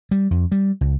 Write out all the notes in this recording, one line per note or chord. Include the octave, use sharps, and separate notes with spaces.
G3
F2
G3
C#2